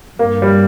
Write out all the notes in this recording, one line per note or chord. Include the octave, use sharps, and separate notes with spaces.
G2 A#3
G3